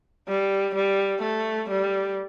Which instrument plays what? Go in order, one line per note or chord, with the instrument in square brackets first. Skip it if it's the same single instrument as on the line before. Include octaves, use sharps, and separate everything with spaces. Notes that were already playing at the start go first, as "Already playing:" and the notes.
[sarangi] G3
G3
A3
G3